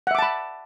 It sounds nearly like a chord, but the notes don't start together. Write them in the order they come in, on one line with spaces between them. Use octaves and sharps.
F#5 E5 D6 A5 B5